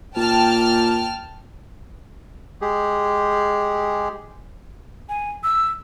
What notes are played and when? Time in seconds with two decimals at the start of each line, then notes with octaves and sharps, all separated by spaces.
0.16 A#2 G5 A5 F6
2.61 G#3 G4 G#4
5.09 G#5
5.44 E6